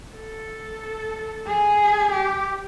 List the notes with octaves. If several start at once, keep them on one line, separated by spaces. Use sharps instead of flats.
A4
G#4
G4